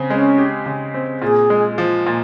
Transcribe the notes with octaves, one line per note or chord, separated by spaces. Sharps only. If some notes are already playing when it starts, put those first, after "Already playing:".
Already playing: C#3 C4
G#3 C#4
G4
C#3
C4
A#2 G#4
G#3
F3
A#2